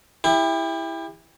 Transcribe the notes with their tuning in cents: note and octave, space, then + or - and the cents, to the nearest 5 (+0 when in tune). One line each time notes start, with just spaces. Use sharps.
E4 +0 G4 +35